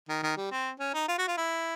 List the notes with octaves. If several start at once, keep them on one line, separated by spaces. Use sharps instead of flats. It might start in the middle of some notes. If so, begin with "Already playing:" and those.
D#3
D#3
G3
C4
C#4
D#4
F4
F#4
F4
E4